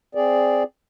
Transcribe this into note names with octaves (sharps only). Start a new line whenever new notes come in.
C4 G#4 D5